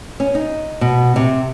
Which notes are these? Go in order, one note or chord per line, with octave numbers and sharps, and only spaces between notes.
C#4
D#4
B2
C3